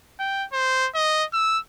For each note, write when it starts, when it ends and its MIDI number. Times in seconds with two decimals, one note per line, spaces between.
0.20 0.45 79
0.53 0.88 72
0.95 1.25 75
1.33 1.59 88